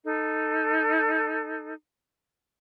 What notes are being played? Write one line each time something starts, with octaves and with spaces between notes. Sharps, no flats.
D#4 A4